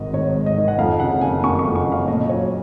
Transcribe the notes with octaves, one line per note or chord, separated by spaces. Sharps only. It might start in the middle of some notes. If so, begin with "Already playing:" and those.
Already playing: G#1 G#2 D#3 D#5
G#1 C#5
G#2
D#5
D#3
F#5
F2 F5
C#3 F#5
F#1 G#5
F#1 C#6
C#6
F2
C#6
C#3
F5
A#2 D#5
F#3 C#5